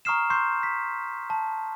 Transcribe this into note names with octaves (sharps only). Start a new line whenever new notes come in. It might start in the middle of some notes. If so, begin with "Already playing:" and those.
A#5 C#6 D#6 F6 C7 E7
C6 C#6 G6 C7
B6
A5